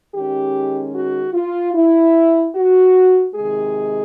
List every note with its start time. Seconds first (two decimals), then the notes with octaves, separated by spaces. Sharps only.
0.12 D#3 G#3 C#4 G4
0.93 F#4
1.34 F4
1.75 E4
2.55 F#4
3.35 C3 D#3 G#3 G#4